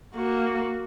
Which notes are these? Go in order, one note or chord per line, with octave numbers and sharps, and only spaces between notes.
A#3 F#4